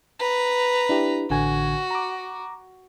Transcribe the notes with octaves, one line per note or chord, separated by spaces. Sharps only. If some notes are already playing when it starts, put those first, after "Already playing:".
B4 A#5
D4 E4 G4
A1 D3 F#4 G#5
A#5 D6